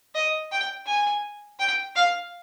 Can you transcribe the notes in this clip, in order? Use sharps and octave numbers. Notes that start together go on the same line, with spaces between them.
D#5
G5
G#5
G5
F5